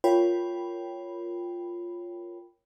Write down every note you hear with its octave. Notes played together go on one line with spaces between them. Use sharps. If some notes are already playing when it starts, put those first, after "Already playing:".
F4 A#4 C#5 G5 B5